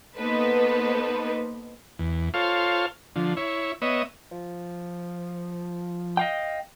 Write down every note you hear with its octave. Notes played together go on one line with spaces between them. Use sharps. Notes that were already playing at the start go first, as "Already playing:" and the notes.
A#3 B3 D#4 A4 B4 C5
E2
F4 A4 C5 C#5 F5
D3 F3
E4 C#5
B3 C#5 D#5 E5
F3
D#5 F5 G5